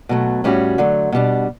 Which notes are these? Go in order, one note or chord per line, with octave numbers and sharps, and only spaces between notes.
B2 F#3 A3
A2 G3 C#4 F#4
D3 F#3 A3
B2 G3 D4